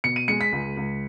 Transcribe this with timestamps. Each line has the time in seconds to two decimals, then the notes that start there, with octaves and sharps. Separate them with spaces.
0.04 B2 C#7
0.16 D#7
0.28 G#3 C#7
0.41 B6
0.52 C#2
0.77 C#2